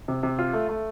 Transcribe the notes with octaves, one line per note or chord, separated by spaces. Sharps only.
C3
C3
F4
A3
A3